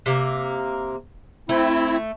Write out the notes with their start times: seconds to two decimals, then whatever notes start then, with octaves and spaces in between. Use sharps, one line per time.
0.06 C3 A#3
1.49 A3 C4 E4